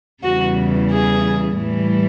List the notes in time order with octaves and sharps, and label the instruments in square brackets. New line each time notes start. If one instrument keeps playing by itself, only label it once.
[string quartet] E2 C#3 E3 G3 F#4
G#4
A2 E3 G3